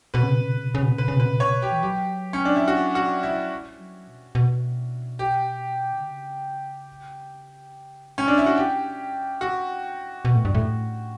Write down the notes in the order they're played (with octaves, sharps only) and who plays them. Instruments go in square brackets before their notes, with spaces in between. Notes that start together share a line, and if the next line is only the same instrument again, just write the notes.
[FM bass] B2 [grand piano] B4
[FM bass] C#3
B2
C#3
B2
C#3
B2
C#3
B2
C#3
[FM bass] B2 [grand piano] B4
[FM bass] C#3
[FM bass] B2 [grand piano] B4
[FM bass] C#3
B2
[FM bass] C#3 [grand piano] C#5
[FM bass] B2
[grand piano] G4
[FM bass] E3
[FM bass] F#3 [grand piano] G4
[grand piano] C#4
D4
E4
F#4
F#4
E4
[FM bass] G3
F#3
B2
B2
[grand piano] G4
[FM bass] D3
C#3
[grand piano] C#4
D4
E4
F#4
[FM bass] B2 [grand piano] G4
[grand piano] F#4
[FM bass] B2
A2
G2
A2